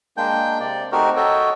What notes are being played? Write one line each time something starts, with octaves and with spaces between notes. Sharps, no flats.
G#3 A#3 D4 G5 G6
C3 D5
A3 C4 D#4 F#4 G4 A#4
F#4 A4 C#5 D#5 E5 G5